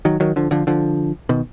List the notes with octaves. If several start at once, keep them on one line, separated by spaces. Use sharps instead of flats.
D#3 F#3
D#3 F#3
D3 F3
D3 F3
D3 F3
B2 D#3